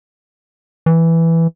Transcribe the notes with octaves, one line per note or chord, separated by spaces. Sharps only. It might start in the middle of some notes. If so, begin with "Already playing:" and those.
E3